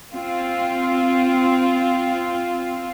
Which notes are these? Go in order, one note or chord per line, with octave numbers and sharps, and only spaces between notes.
C4 F4